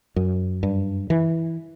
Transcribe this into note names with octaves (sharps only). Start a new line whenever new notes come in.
F#2
G2
E3